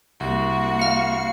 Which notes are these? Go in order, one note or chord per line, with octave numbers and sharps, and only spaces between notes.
C2 A#3 F#4
F5 C#7